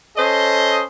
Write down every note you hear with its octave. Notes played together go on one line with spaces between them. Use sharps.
C#4 A4 C5 D#5